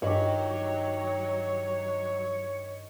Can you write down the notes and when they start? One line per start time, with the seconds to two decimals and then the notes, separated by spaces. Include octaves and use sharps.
0.02 G2 D#3 F#3 G4 C#5